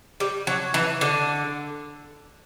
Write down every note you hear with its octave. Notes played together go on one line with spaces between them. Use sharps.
G3
F#3
E3
D3